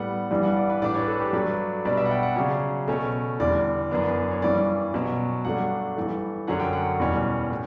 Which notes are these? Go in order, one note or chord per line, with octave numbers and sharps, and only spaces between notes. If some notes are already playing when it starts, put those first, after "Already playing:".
Already playing: A2 G3 B3 F#5
G2 E3 G3 D4
F#5
D5
B4
A2 E3 G3 D4 D5
C#5
B4
A4
G4
G2 F#3 A3 D4 B4
B2 G3 B3 D4 D5
E5
F#5
G5
F#5
C#3 F#3 C#4 D5
B2 A3 C#4
E2 D3 G3 D5
F#2 E3 B3 D4
C#5
G2 E3 G3 C#4 D5
B2 F#3 C#4
G2 F#3 A3 D4 F#5
G2 E3 A3
F#2 D3 F#3 A3 C#4 F#5
G5
F#5
E2 B2 G3 C#4
A2